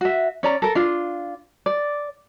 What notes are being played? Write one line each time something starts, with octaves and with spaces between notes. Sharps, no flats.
F#4 E5
C#4 D5 A#5
A4 A#4
D4 F4
D5